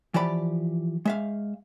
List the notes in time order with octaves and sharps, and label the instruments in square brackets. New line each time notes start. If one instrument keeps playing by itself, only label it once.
[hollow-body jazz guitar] E3 F3 G4 D5 B5
G#3 E5 F5